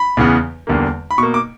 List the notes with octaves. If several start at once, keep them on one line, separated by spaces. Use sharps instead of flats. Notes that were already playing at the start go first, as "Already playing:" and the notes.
Already playing: B5
E2 C#3 E3 B3
E2 D3 G3 A#3
B5
B2 A#3 C#6
D6